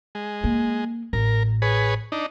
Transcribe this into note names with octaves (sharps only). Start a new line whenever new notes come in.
G#3
A#3
A1 A#4
G#4 B4 C#5
D4 D#4